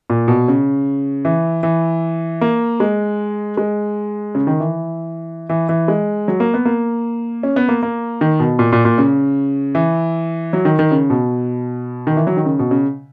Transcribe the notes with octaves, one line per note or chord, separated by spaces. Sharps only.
A#2
B2
C#3
E3
E3
A#3
G#3
G#3
C#3
D#3
E3
E3
E3
G#3
F#3
A#3
B3
A#3
C#4
B3
A#3
A#3
D#3
B2
A#2
A#2
A#2
C#3
E3
F#3
D#3
D#3
C#3
B2
D#3
E3
F#3
D#3
C#3
B2
C#3